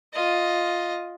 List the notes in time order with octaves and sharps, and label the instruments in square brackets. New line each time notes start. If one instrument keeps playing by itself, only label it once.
[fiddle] F4 D#5